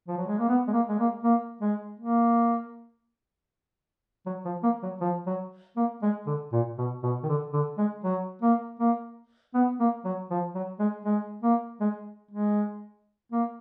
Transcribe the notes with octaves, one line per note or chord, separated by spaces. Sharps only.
F3
F#3
G#3
A#3
B3
G#3
A#3
G#3
A#3
A#3
G#3
A#3
F#3
F3
A#3
F#3
F3
F#3
A#3
G#3
D3
A#2
B2
B2
D#3
D3
D3
G#3
F#3
A#3
A#3
B3
A#3
F#3
F3
F#3
G#3
G#3
A#3
G#3
G#3
A#3